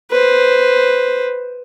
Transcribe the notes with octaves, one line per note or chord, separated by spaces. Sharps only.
B4 C5